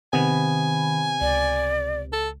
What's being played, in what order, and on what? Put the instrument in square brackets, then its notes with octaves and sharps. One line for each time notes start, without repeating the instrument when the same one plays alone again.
[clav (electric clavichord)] C3 B3 [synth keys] D#3 B5 [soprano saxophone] G#5
[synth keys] C#2 [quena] D5
[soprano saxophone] A4